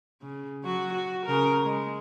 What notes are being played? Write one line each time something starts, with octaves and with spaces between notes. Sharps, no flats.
C#3
F#3 F#4
F#4
C#3 A#4
G#3